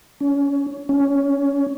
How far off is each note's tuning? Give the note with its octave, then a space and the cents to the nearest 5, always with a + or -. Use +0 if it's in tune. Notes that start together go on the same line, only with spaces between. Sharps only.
C#4 +25
C#4 +15